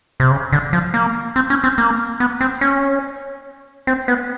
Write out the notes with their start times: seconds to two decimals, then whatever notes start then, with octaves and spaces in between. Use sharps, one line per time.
0.20 C3
0.31 C#3
0.53 D3
0.73 F3
0.94 A#3
1.36 C4
1.50 C#4
1.64 C4
1.78 A#3
2.20 B3
2.41 C4
2.61 C#4
3.87 C4
4.08 B3